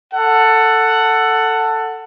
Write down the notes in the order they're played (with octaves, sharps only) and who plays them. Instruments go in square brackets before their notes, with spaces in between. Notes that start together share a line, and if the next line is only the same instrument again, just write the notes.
[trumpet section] A4 F#5